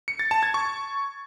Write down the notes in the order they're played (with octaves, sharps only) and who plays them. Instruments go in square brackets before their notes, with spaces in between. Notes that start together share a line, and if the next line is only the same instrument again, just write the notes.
[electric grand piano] C#7
A6
A5
G#6
C#6